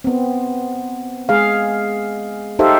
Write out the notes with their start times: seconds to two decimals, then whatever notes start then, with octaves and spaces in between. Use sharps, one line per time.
0.04 B3 C4
1.29 G#3 G#4 F5
2.59 D#4 G4 A4 C5 E5 F5